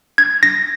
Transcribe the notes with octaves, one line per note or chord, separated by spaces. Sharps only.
G#6
A#6